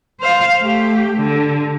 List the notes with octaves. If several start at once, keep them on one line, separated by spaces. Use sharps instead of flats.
C5 F5
A3 G4
D3